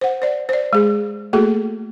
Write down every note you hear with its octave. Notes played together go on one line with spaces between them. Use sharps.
C5 F#5
C5 D5
C5 D5
G#3 G#4
A3 A#3 F#4 G#4 A4